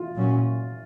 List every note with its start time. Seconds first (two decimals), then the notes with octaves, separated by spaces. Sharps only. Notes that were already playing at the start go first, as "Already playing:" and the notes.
Already playing: F4
0.15 A#2 F#3 C#4